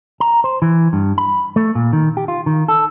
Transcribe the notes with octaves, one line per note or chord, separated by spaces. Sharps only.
A#5
C5
E3
G2
B5
A3
A#2
D#3
G4
F4
D#3
A4